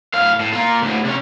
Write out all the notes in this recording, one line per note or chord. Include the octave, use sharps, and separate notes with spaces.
A2 F5
A2
A#3 F4
D2 A2
C3 C#4